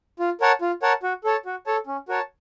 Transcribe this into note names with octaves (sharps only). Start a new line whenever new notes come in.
F4
A#4 C#5 F#5 A5
F4
A#4 C#5 F#5 A5
F#4
A4 C#5 A5
F#4
A4 C#5 A5
C#4
F#4 A#4 C#5 A5